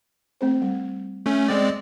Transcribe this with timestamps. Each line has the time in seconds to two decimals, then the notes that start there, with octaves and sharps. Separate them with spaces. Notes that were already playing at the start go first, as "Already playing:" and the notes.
0.41 A3 C4 C5
0.62 G3
1.26 A3 C#4
1.48 G#3 C4 D5